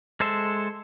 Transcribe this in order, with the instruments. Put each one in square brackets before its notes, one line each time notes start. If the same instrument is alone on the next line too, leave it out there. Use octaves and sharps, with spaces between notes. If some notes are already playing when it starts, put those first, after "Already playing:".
[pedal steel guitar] G#3 A4 C5 E5